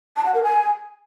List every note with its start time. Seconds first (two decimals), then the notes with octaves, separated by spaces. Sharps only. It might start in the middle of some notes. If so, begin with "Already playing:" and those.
0.16 A5
0.25 F#5
0.34 A#4
0.43 G#5